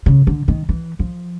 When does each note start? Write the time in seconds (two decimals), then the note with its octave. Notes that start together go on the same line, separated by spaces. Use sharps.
0.06 C#3
0.27 D3
0.48 D#3
0.69 E3
0.99 F3